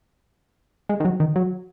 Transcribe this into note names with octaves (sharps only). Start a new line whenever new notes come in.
G#3
D#3
F#3
D#3
F#3